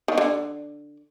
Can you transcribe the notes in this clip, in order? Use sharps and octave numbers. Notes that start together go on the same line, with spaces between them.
D#3
D3